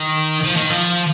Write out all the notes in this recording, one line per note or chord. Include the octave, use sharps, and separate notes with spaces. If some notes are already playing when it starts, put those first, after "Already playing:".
Already playing: D#3
F3
D#3
F3